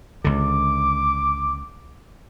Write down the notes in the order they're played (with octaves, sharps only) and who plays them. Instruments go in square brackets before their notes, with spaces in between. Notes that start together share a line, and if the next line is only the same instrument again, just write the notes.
[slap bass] C#2 D3 [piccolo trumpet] D6